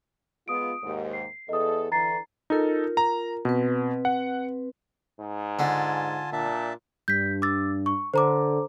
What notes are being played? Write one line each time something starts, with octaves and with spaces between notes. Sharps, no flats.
G#3 B3 F4 D#6 D7
D#2 G#2
C7
E2 A4 D#5 D#6
D3 E3 A#5 A6 C7
D#4 F4 A4 A#4
A#5
B2 C4 B4
F#5
G#2
D3 F4 G#5 A5
A#2 D4 E5 A5
G2 G6 B6
D6 E6 A6
C#6
D3 C5 A#5 D6